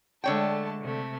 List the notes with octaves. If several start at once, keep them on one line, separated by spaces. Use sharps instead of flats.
D3 G#3 A3 C#5 G5 A5
C3 A3